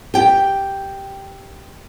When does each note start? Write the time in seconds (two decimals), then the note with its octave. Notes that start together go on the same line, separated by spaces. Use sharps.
0.14 G4 G5